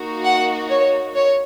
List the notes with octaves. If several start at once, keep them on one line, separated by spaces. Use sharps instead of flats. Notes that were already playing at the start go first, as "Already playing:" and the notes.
Already playing: A#3 D#4 F#4
F#5
C#5
C#5